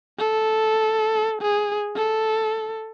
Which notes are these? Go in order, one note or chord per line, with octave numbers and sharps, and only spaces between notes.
A4
G#4
A4